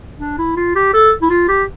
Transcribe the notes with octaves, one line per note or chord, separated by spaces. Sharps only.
D4
E4
F4
G4
A4
E4
F4
G4